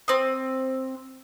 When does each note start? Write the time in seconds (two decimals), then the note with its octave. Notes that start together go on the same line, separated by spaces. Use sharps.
0.08 C4 D#6